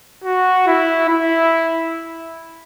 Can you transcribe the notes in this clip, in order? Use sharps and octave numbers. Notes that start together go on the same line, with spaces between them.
F#4
E4
E4